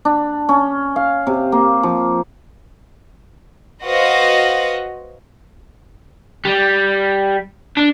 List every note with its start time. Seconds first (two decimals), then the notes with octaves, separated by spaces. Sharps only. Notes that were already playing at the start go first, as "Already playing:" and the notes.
0.05 D4
0.49 C#4
0.96 F5
1.27 C3
1.52 A#3
1.83 F3
3.84 F#4 B4 C5 D#5 F5 F#5
6.45 G3
7.77 D4